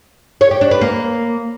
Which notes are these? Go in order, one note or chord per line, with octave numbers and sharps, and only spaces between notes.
C#5
G4
D4
B4
A#3